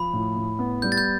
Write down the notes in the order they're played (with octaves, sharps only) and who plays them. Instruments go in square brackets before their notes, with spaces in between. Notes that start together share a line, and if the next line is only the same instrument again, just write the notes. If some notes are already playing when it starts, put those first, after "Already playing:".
Already playing: [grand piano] F3 [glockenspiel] B5
[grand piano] A2
A2
B3
[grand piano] G3 [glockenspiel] G6
[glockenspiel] A6
G6